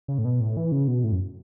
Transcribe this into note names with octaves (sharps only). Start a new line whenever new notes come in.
C#3
A2
B2
A2
E3
C#3
B2
A2
F#2